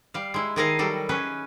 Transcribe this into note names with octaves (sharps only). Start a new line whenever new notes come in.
G3 F5
G#3 E4
D#3 E4 G#4 A#4 D#5 F5
F#3 G3 A4
C#4 G#4 B4